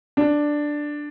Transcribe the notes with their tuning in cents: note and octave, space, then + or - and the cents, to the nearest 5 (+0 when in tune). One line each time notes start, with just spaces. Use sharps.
D4 +5